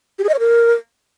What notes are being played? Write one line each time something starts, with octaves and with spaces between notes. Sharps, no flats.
G4
G#4
D#5
C#5
A#4